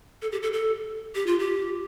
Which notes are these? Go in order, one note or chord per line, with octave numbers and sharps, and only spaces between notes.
A4
G4
A4
A4
G4
F4
G4